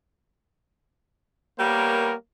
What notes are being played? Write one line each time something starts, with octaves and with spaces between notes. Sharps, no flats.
G3 A#3 B3 A#4 C#5